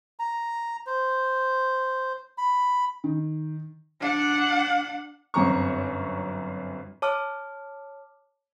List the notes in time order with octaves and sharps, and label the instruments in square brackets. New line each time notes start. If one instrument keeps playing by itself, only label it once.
[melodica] A#5
C5
B5
[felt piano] D#3
[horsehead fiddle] D4 F#5
[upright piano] G1 F#2 C4 A#5 C#6
[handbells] C#5 A5 D6 F6